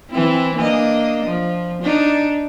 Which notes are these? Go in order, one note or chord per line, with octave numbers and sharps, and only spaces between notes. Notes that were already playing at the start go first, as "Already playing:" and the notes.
E3 C4 E4
A#3 D4 D#5
F3
D4 D#4